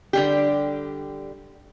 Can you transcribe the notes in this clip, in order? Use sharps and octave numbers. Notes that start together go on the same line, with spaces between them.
D3 G3 G4